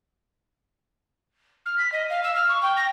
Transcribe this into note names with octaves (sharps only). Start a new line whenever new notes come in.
F6
B6
D#5
F5
E6
F6
C#6
G5
A#6